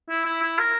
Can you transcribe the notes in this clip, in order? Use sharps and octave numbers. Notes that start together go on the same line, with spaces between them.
E4
E4
E4
A#4